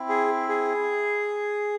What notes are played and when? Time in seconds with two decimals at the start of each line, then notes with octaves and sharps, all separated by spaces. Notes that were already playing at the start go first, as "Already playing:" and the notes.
Already playing: C4 E4
0.09 G#4
0.49 G#4